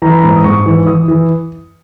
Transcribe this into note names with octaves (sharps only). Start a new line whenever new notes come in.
E3 A#5
B5
G#2 A#5
D#6
G#2 C#6
E3
E3 D#6
E3